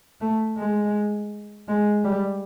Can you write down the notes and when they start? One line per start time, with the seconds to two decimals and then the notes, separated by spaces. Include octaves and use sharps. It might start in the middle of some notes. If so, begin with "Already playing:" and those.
0.21 A3
0.57 G#3
1.68 G#3
2.04 G3